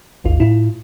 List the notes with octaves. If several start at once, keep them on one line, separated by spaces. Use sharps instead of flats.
G#1 D#2 F4
A2 E4 F4